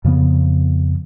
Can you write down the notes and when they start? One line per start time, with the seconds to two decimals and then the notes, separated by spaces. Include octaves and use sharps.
0.04 F2 C#3 F3 B3